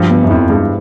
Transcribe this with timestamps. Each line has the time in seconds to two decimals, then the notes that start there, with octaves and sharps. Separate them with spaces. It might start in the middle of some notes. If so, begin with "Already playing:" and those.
Already playing: G2 F3
0.10 B3
0.23 F#2
0.30 F2 E4
0.50 G2 G#3